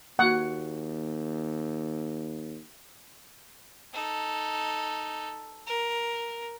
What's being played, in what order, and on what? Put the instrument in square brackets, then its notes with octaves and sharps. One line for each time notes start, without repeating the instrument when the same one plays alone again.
[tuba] D#2 [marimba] A#3 F#4 [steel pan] F#5
[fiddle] D#4 A4
A#4